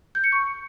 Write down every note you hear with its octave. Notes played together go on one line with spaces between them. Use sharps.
G6
C#7
C#6